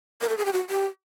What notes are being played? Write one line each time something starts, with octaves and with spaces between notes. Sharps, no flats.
A#4
A4
G#4
G4
F#4
G4